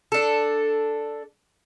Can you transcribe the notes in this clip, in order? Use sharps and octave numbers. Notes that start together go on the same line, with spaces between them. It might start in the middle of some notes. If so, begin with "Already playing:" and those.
D4 A4